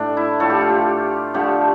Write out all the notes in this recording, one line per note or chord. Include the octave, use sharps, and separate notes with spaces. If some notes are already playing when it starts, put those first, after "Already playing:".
Already playing: A2 A3 D4
E4
A2 F3 A3 A4
G4
F4
G4
D3 F3 A3 G4